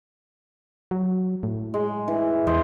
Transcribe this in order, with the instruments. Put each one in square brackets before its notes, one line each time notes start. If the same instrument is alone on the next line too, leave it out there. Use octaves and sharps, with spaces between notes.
[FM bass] F#3
A2
[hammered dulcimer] G#3
E3
[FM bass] E2 [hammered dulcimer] C5 D#5